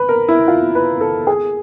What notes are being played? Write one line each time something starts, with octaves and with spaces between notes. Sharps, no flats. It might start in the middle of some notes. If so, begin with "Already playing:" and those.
Already playing: B4
A#4
E4
F4
B4
A4
G#4